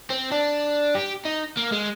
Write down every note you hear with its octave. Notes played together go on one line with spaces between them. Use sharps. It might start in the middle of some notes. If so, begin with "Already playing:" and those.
C4
D4
G4
D#4
A#3
G#3